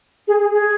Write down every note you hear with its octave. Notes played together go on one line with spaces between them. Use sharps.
G#4
G#4
G#4